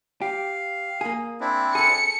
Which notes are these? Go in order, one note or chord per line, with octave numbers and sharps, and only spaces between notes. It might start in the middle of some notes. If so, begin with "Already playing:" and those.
G4 F5
A#3 G#4
C4 D4 E4
G#4 A4 C#7